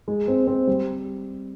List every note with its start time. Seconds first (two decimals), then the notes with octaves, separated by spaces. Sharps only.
0.08 G#3
0.28 C4
0.47 C4
0.67 G3